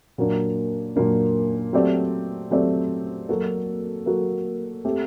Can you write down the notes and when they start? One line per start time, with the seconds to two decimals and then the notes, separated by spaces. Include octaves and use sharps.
0.18 A#2 F#3 A#3 D4
0.96 A#2 F#3 A#3 D4
1.73 F#3 A3 C4 G4 D5
2.51 F#3 A3 C4 G4 D5
3.29 F#3 A#3 F#4 A4
4.06 F#3 A#3 F#4 A4
4.85 A3 C4 G4